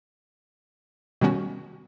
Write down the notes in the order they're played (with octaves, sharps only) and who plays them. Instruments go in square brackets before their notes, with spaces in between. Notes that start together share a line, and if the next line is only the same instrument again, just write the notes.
[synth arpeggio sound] B2 D#3 G3 B3 C#4 F#4